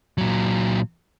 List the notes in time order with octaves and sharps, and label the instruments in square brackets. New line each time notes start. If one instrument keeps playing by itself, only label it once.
[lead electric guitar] A#2 F#3